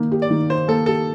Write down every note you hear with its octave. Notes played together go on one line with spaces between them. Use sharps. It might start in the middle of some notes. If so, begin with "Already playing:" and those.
Already playing: D#3 A#3 D#4
G4
D5
D#3
D#4 C5
A#3 A4
G4 A4